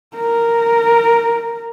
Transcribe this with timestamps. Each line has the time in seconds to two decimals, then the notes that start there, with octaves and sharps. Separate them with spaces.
0.16 A#4